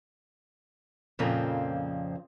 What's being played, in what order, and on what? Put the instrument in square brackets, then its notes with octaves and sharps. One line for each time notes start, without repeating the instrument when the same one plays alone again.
[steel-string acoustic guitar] F2 A#2 C#3 F3 A#3 C4